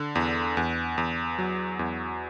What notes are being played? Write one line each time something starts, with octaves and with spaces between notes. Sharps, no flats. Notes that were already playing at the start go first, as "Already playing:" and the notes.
Already playing: D3
E2
E2
E2
F#3
E2